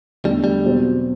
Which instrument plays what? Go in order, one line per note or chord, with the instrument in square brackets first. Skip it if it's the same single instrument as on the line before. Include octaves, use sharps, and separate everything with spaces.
[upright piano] E2 D3 A3 [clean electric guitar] G3
[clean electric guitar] G3
[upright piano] E2 B2 F#3 C4